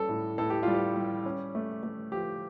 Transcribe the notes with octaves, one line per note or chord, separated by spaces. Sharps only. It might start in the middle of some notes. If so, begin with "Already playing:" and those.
Already playing: G3 C#4 A4
A2
A2 A4
G4
G3 F4
G4
G3
C#4
A3
A3
F3 G4